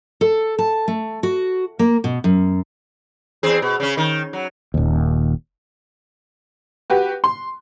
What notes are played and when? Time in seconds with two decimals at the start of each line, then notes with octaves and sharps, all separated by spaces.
0.21 A4
0.59 A5
0.88 A3
1.23 F#4
1.79 A#3
2.04 B2
2.24 F#2
3.43 E2 C4 G#4
3.62 B2
3.80 C#3 C#4
3.97 D#3
4.33 F#3
4.74 D#1 D#2
6.90 F#4 G4 B4
7.24 C6